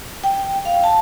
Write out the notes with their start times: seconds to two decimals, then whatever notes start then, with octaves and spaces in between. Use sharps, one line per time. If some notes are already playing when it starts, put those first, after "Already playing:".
0.24 G5
0.65 F5
0.84 A5